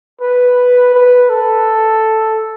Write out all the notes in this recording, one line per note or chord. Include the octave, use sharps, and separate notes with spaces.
B4
B4
A4